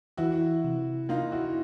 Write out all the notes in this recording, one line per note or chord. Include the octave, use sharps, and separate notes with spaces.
E3 E4 F#4
C3
A#3 D#4 F4
E4 F#4